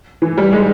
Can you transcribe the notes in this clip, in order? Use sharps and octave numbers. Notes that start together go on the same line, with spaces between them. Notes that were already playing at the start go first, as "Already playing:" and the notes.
E3
G3
G#3